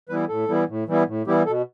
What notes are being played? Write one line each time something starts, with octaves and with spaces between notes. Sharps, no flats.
E3 G3 B3 E4 B4
A2 A4
E3 G3 B3 E4
A2
E3 G3 B3 E4
A2
E3 G3 B3 E4 G4
B2 A4